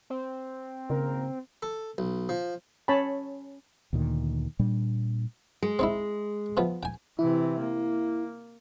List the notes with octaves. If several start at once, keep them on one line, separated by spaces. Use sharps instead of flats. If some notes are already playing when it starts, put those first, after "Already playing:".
C4
G#1 C#3 A#3 A#4
A4
B1
F3
C#4 C#5 G#5 A5 B5
D2 A#2 D#3
A#2 G3 D4
G#3
C4 D#4 E4
E3 F3 B3
G5 G#5
C3 E3 E4
A#3